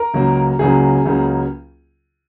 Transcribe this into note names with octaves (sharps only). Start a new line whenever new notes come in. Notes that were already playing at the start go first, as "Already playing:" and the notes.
Already playing: A#4
C#2 C#3 F#3 A#3
C#2 C#3 F#3 A#3 G#4
C#2 C#3 F#3 A#3